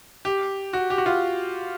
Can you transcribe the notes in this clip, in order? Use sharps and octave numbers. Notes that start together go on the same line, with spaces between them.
G4
F#4
G4
F#4
F4